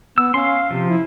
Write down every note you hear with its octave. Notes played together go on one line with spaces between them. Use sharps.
B3 E6
C#4 F5 C6
C3 F3
E4